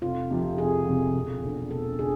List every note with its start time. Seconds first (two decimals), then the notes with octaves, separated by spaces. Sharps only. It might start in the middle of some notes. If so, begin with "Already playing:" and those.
0.02 F1 F4
0.30 F2 C3 F3
0.58 F1 G#4
0.86 F2 C3 F3
1.15 E1
1.43 E2 D3
1.71 E1 A4
1.99 D3 G#4